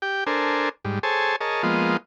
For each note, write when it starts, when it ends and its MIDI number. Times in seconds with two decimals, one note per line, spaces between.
0.02 0.24 67
0.02 0.24 79
0.27 0.69 62
0.27 0.69 69
0.27 0.69 70
0.27 0.69 72
0.27 0.69 80
0.85 0.99 44
0.85 0.99 55
1.03 1.36 68
1.03 1.36 69
1.03 1.36 72
1.03 1.36 73
1.03 1.36 80
1.03 1.36 81
1.41 1.63 68
1.41 1.63 70
1.41 1.63 73
1.41 1.63 75
1.41 1.63 81
1.63 1.97 53
1.63 1.97 56
1.63 1.97 58
1.63 1.97 59
1.63 1.97 65
1.63 1.97 75